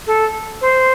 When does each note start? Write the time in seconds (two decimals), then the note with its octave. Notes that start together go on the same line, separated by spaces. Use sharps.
0.07 A4
0.61 C5